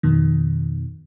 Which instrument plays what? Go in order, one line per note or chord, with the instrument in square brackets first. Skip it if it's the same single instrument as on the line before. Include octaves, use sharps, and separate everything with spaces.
[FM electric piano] F2 B2 D#3